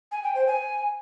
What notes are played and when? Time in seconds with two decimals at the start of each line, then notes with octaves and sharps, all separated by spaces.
0.12 G#5
0.23 G5
0.35 C5
0.47 G#5